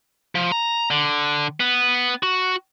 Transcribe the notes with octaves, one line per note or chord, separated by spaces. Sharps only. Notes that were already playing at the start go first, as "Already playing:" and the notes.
F3
A#5
D3
B3
F#4